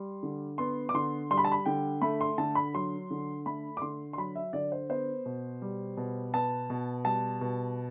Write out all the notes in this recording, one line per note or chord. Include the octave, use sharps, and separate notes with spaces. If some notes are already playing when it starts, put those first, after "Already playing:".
Already playing: G3 C6
D3
B3 C6
D6
D3 C6
G3 C6
B5
A5
B5
D3 G5
A3 B5
C6
D3 A5
B5
F#3 C6
D3
A3 B5
D6
D3 C6
C6
F#3 B5
E5
D3 D5
C5
B3 C5
B2
G3
B2
B3 A5
B2
G3 A5
B2